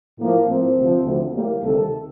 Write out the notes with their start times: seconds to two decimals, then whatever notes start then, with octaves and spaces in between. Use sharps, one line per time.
0.19 A2 F3 A#3
0.48 A2 F3 C4
0.77 D2 C3 F3
1.05 D2 D3 F3
1.34 A2 G3 A#3
1.63 D2 C3 D#3 G3 A4